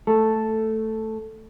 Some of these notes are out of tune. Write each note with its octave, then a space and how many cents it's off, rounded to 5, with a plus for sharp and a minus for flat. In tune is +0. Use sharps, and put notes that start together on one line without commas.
A3 +5 A4 +0